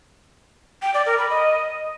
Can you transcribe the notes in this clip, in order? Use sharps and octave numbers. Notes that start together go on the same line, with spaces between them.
G5
D5
A#4
B5
D#5